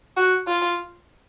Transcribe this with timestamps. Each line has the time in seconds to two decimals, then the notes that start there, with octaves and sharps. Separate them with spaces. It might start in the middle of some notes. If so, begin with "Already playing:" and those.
0.17 F#4
0.47 F4